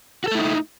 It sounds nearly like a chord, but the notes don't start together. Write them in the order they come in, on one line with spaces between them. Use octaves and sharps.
F#4 A4 A3 E4 D#4